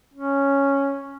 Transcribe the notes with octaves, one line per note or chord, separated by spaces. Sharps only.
C#4